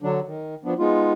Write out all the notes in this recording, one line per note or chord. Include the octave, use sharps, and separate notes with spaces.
D3 F#3 D4
D#3
F3 B3 D4
G#3 B3 D#4 F4